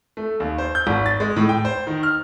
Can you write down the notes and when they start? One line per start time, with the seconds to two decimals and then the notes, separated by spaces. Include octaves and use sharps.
0.17 A3
0.40 D#2
0.58 C5
0.75 G6
0.87 G#1
1.06 A6
1.20 G#3
1.36 A2
1.49 G5
1.65 C5
1.87 D#3
2.03 F6